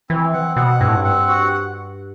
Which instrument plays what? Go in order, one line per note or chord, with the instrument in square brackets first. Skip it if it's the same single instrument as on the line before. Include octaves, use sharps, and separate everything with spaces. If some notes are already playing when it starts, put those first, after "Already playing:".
[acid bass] E3 [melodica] C4
[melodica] F#5
[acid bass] B2 [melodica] F#5
[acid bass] G2 [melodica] C4
[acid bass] A2
G2
[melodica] F#5
F#4